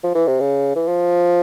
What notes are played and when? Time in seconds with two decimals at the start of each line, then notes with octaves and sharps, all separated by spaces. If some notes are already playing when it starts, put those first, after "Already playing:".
0.04 F3
0.15 E3
0.27 C3
0.40 C#3
0.76 E3
0.88 F3